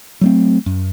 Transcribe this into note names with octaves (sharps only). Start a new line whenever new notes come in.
F#3 A3 C4
F#2